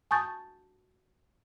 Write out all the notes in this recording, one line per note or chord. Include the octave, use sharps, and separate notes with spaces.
G#5 A5 C#6 D#6 G6 A6